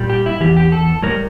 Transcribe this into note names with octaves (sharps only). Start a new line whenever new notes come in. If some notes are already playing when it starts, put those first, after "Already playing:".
Already playing: A#2 G3
G4
E4
E2 E3 G4
G4
A4
A2 G3 A#4